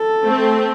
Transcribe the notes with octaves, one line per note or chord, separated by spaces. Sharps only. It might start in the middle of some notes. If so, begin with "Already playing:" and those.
Already playing: A4
A3 C4